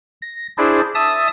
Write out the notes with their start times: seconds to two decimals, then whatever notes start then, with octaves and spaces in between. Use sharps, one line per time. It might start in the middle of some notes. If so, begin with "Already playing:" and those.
0.22 A#6
0.58 D4 E4 G#4 C5 D5
0.95 E5 A5 D#6